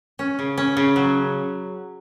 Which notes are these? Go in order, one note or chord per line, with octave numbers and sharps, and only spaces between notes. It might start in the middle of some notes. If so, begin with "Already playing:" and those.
C#4
C#3
C#4
C#3
F#3